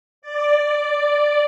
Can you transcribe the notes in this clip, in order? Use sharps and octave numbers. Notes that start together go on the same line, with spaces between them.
D5